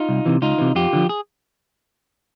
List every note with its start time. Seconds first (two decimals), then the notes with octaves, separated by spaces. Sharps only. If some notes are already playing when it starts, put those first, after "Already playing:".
Already playing: D#4 F4
0.09 C2
0.26 C3 E3
0.42 C#2 D#4 F4
0.58 C3 E3
0.75 F2 F4 G4
0.93 D3 F3
1.09 G#4